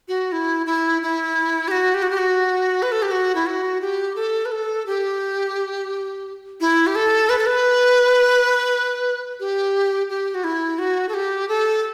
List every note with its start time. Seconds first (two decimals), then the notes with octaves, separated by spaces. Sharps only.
0.08 F#4
0.32 E4
0.66 E4
1.02 E4
1.68 G4
1.71 F#4
1.94 G4
2.02 F#4
2.10 G4
2.18 F#4
2.82 B4
2.92 A4
3.02 G4
3.11 F#4
3.35 E4
3.46 F#4
3.81 G4
4.16 A4
4.46 B4
4.51 A4
4.86 G4
6.61 E4
6.87 G4
6.95 A4
7.29 B4
7.39 A4
7.46 B4
9.40 G4
10.10 G4
10.34 F#4
10.44 E4
10.79 F#4
11.09 A4
11.14 G4
11.49 A4